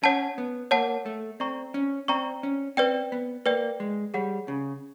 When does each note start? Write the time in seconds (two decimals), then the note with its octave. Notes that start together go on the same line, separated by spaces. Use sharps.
0.03 C#4 C#5 F#5 A5
0.38 B3
0.71 A#3 C#5 F#5 A5
1.06 A3
1.40 C4 D5 G5 A#5 C#6
1.74 C#4
2.08 C4 D5 G5 A#5 C#6
2.43 C#4
2.77 C4 B4 D5 G5
3.12 B3
3.46 A#3 B4 D5 G5
3.80 G#3
4.14 G3 G#4 C#5 F#5
4.48 C#3